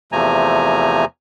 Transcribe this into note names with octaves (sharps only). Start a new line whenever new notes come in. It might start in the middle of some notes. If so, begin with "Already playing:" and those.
E2 C3 F3 A3 G#5 A#5